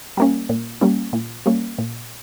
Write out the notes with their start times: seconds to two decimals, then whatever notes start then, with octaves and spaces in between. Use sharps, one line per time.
0.17 G3 A#3 C#4
0.49 A#2
0.81 G3 A#3 C#4
1.13 A#2
1.46 G3 A#3 C#4
1.79 A#2